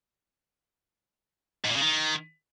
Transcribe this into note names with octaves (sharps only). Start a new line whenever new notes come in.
G#2
A#2
C#3
D#3